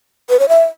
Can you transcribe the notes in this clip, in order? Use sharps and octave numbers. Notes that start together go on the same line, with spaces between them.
B4
C#5
E5